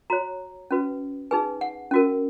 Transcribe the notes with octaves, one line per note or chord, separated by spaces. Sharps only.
F#4 C#5 A#5
C#4 F#4 B4
D#4 G#4 B4 G#5
F#5
C#4 F#4 A#4